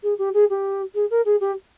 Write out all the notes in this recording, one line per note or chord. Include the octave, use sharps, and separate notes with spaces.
G#4
G4
G#4
G4
G#4
A#4
G#4
G4